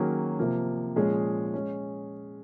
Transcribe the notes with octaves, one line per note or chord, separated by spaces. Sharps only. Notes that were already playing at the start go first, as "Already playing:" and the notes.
Already playing: D#3 F#3 A#3 C#4 G#4
C3 F3 A#3
A#2 F3 G#3 C#4 G#4
G#3 C#4